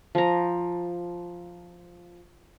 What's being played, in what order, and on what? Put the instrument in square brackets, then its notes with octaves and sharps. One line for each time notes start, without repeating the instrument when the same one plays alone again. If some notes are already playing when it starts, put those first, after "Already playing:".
[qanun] F3 A#5